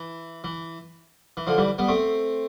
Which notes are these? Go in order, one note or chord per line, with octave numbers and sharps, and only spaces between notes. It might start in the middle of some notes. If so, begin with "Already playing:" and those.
Already playing: E3
E3
E3
D3 F3
E3 G3
G3 B3
A3 C4